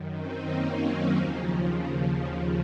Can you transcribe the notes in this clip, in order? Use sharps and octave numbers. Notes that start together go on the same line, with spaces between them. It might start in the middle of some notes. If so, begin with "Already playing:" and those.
Already playing: F#2 D#3
C4 D#4
A#3 C#4
F#3
D#2 C#3 F3